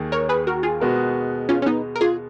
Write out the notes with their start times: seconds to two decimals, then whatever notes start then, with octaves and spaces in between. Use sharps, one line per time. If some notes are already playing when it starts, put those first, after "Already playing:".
Already playing: D#2 D#3 A#3 G#4
0.12 A#4 C#5
0.29 G#4 B4
0.47 F#4 A#4
0.63 F4 G#4
0.80 B2 G#3 B3 F#4 A#4
1.49 C#4 F4
1.62 C#4
1.66 B3 D#4
1.96 A#4
2.01 F4 G#4